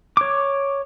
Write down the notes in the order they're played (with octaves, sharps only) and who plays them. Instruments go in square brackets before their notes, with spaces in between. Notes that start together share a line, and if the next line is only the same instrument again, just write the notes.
[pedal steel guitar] C#5 D6